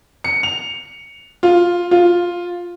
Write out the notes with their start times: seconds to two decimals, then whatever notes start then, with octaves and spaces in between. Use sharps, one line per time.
0.24 C#7
0.43 F7
1.43 F4
1.91 F4